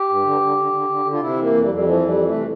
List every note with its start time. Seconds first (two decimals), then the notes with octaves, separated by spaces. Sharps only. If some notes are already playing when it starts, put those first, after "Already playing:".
Already playing: G4
0.09 G2
0.24 D3
0.41 D3
0.57 D3
0.72 D3
0.89 D3
1.05 D3
1.13 F4
1.20 C3 E4
1.37 E3 A#3
1.52 F2
1.62 G3
1.68 F2
1.74 G3
1.84 E3 F3
2.00 F2
2.05 G3
2.16 E3
2.27 A3
2.33 C3